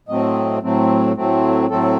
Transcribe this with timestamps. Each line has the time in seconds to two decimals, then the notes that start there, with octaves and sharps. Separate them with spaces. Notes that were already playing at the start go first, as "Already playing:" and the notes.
0.08 A2 F#3 A3 C4 D#5
0.62 A2 F#3 A3 C4
1.16 A2 F#3 A3 C4
1.70 A2 F#3 A3 C4 A4